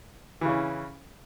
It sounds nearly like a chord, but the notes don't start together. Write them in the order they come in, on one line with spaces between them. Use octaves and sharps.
E3 C#3 C#4